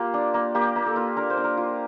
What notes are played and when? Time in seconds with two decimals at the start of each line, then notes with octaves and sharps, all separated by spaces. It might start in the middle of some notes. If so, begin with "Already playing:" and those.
Already playing: A#3 F4 G4
0.14 D4
0.34 A#3
0.55 A#3 G4
0.76 A#3
0.86 A4
0.96 F4
1.16 D4 A#4
1.30 C5
1.37 D4
1.44 A#4
1.57 F4